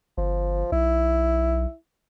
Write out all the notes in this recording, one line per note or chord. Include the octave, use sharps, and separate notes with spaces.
G1 F3
B1 E4